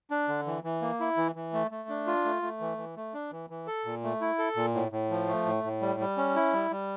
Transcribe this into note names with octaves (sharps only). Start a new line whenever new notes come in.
D4
D3
E3
E3
A#3
E4
E3
E3
A3
A3
D4
F4
A3
A3
E3
E3
A3
D4
E3
E3
A4
A#2
A3
E4
A4
A#2
A2
A2
F3
A3
A2
A2
G3
G3
C#4
E4
G3
G3